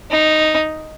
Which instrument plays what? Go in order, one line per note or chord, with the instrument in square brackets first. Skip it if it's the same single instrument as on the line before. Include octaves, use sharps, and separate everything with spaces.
[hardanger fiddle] D#4